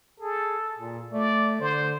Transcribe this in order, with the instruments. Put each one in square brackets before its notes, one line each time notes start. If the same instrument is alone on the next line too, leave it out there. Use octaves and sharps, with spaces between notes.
[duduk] G#4 [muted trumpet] A4
[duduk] A#2
[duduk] A3 [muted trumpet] D5
[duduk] D3 [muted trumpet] C5